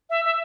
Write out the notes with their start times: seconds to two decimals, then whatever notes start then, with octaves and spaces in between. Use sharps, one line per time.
0.10 E5
0.25 E5